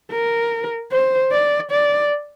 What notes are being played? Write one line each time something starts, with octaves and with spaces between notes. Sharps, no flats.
A#4
C5
D5
D5